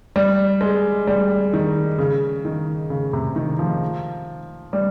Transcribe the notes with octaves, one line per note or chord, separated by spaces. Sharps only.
G3
G#3
G3
D#3
C#3
D#3
C#3
C3
D#3
F3
G3